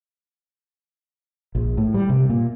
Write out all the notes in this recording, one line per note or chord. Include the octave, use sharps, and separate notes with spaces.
A#1
A2
G3
C3
A#2